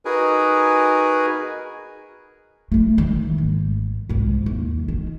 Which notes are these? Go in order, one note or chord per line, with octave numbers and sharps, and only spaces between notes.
D#4 F#4 G#4 A#4 B4 G#5
A3 E4
D#3
G#1
C2 G#2
D#2
D#3